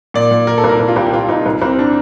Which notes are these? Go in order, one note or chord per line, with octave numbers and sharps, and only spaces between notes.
A#2 D5
A#2
A#2 A#4
A4
C2
A#4
C2
F4
C2 G4
G4
C2 F4
C2 D#4
C2
C2 C4
D4